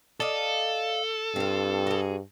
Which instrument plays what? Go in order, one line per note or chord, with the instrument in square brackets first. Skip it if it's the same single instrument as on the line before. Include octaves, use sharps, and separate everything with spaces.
[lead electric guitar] A4 [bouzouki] D5 D#5 F5
[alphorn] G2 [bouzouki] C4 F4
[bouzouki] F#4 G#4